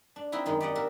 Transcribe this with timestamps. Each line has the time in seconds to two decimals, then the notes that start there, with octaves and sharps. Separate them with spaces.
0.16 D4
0.32 C4 D#4 E4 F#4
0.46 F#2 D#3 G#3 D#4
0.60 G4 D5 D#5 F#5
0.75 A#3 F#4 A#4 E5